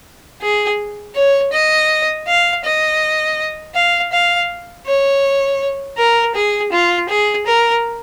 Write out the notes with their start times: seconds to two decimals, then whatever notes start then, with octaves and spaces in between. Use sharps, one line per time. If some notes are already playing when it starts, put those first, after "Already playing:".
0.42 G#4
1.15 C#5
1.52 D#5
2.27 F5
2.64 D#5
3.74 F5
4.12 F5
4.86 C#5
5.98 A#4
6.35 G#4
6.72 F4
7.09 G#4
7.46 A#4